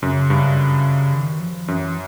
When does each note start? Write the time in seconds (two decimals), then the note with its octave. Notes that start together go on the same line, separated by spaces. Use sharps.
0.02 F#2 C#3
0.30 G2
1.13 D#3
1.40 F3
1.68 F#2 E3